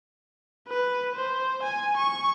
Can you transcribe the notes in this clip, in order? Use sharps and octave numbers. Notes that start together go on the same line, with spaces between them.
B4
C5
G#5
C#6